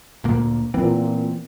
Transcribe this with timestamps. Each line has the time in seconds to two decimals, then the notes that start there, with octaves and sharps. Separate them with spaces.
0.24 D2 A#2 A#3
0.74 A#2 E3 B3 C4